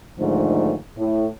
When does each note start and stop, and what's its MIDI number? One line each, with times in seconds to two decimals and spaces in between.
0.19 0.75 39
0.19 0.75 44
0.19 0.75 50
0.19 0.75 53
0.19 0.75 57
0.97 1.26 45